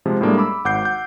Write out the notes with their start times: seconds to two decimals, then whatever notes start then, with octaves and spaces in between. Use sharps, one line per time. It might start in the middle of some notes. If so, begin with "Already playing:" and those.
0.06 C3 F3 G#3
0.21 A2 G3 G#3 A#3 D4 A4
0.38 B5 D6 E6
0.65 G#1 F#5 D6 G6 C7
0.83 F#5 G6